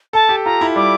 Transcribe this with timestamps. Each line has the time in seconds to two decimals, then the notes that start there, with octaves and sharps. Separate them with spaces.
0.13 A4 A5
0.29 G4
0.45 F4 A#5
0.61 E4
0.76 G3 D6